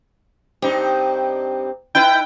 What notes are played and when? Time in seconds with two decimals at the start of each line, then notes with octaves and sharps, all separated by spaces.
0.62 G2 C4 D#4 G4
1.95 D#4 E4 B4 G5